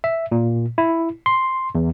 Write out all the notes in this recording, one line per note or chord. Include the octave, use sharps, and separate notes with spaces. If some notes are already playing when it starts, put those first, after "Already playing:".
E5
A#2
E4
C6
E2